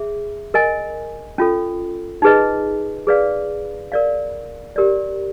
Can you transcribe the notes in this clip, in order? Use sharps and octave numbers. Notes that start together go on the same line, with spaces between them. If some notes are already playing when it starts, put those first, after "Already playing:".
Already playing: G#4 E5
A#4 D#5 G#5
C#4 F4 A4
D#4 G#4 B4 D#5
G#4 B4 D5 F5
A#4 D5 F5
G4 A#4 D5